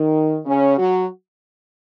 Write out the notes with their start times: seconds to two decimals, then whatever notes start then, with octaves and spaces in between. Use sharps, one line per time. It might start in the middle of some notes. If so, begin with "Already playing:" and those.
Already playing: D#3
0.46 C#3 C#4
0.78 F#3 F#4